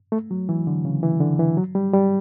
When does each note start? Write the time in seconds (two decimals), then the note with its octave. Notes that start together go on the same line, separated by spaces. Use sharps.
0.12 A3
0.31 F#3
0.49 E3
0.67 D3
0.85 C#3
1.03 E3
1.20 D3
1.39 E3
1.57 F#3
1.75 G3
1.93 G3